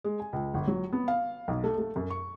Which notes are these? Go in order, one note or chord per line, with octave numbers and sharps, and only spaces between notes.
G#3
G#5
C#2
G1
F#3
B3
F5
B1
A3
A3
F#2
C#6